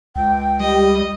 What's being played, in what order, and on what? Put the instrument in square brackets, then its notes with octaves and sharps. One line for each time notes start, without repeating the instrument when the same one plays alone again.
[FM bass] C#2 [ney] G5
[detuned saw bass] G3 [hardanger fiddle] D#5